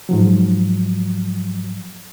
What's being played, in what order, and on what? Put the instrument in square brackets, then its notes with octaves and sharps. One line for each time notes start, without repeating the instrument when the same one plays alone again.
[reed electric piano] G#2 F3 F#3